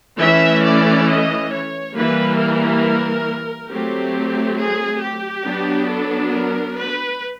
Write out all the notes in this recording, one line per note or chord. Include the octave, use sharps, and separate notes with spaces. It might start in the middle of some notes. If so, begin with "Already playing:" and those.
E3 A3 C#4 E5
D5
D#5
C#5
E3 G3 A#3 B4
A#4
F#3 A3 C4 G4
G#4
G4
F#3 B3 D4
A4
A#4
B4